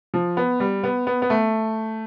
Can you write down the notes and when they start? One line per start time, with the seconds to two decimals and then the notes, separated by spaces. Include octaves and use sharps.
0.14 F3
0.37 B3
0.60 G3
0.84 B3
1.07 B3
1.22 B3
1.30 A3